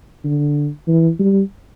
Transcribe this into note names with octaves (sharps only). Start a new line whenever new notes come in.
D3
E3
G3